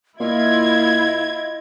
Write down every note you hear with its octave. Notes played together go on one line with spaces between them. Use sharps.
A#2 E4 F4 D#5 G#6